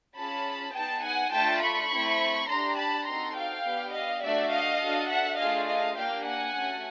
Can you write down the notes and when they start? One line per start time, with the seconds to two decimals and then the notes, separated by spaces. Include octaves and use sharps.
0.17 C#4 F4 G#4 A5 B5
0.75 B3 D#4 G#4 G5 A5
1.04 F#5 G#5
1.33 A3 D4 F4 A4 G5 A5
1.62 B5 C#6
1.91 A3 C4 E4
2.48 D4 G4 A#5 C6
2.78 A5 B5
3.07 C4 D#4 F#4 A4 A#5 C6
3.36 F5 G5
3.64 B3 D4 G4
3.93 D#5 F5
4.23 A3 D4 F#4 D5 E5
4.52 D#5 F5
4.81 D4 F#4 A4
5.10 E5 F#5
5.38 A3 D4 F4 G#4 D#5 F5
5.68 D#5 F5
5.96 A#3 D4 G4 F5 G5
6.25 F#5 G#5
6.55 A3 C#4 F#4 A4